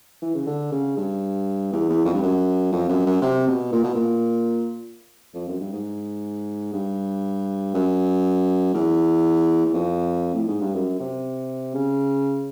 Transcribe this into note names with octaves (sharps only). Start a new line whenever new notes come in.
E3
C#3
D3
C#3
G2
E2
E2
F2
G2
F#2
F2
F#2
F#2
C3
B2
A#2
B2
A#2
F2
F#2
G2
G#2
G2
F#2
E2
E2
F2
A2
G#2
G2
F#2
C3
C#3